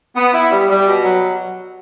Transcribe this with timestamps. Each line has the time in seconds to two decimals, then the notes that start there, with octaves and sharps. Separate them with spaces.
0.16 B3
0.33 E4
0.51 G3
0.69 G3
0.87 B2
1.04 F#3